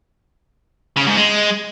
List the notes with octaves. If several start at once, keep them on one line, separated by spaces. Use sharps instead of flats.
C#3
G#2
G#3